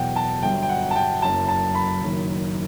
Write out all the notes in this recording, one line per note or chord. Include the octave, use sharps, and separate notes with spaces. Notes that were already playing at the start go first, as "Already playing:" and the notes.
Already playing: E2 B2 F#3 F#5 G5
A5
G1 G2 F#3 G5
G5
F#5
A5
G5
F#1 F#2 F#3 A5
A5
B5
F#1 F#2 D#3